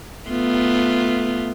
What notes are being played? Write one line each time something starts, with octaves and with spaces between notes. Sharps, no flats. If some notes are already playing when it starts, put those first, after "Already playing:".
A3 B3 F4